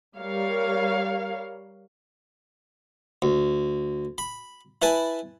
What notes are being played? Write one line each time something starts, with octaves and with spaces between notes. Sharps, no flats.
G3 A#4 C#5 F5
D2
B5
E4 B4 G#5 A5